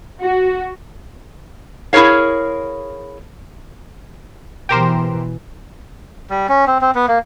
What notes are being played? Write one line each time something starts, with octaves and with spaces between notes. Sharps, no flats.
F#4
E4 G#4 A#4 C#5 F5
B2 E3 G4 A#4 C5
G3
C#4
C4
C4
B3
A#3